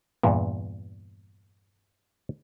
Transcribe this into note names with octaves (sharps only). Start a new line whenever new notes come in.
E2 G2 A#2